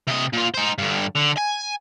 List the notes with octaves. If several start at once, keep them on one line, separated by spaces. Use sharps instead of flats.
C3 D#5
A#2 F4
D#4 C5
G2 D3
D3
G#5